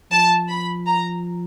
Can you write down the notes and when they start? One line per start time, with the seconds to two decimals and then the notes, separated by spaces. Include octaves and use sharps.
0.11 F3 A5
0.49 B5
0.87 A#5